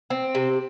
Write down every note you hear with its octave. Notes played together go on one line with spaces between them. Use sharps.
C4
C3